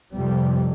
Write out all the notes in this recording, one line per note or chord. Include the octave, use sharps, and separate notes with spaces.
F2 C3 G3